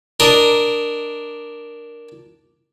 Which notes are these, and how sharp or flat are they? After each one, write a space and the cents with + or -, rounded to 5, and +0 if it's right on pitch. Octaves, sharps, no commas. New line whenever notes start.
D4 +0 A#4 +0 D#5 +0